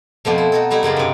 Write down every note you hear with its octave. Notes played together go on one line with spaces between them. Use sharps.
F2 B2 F3 A3
E4
D#4 F#4 A4
G3 A3 D#4 E4
F#2 C#3 F#3 F4
G2 C3